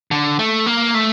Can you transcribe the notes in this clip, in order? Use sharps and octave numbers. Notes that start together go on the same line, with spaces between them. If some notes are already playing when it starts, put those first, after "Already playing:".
D3
A3
A#3
A3